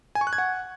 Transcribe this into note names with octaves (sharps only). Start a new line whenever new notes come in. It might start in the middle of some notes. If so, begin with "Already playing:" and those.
G#5
C#6
F#6
G#6
F#5